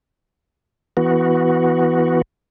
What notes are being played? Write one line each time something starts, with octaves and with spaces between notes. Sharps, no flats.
E3 B3 F#4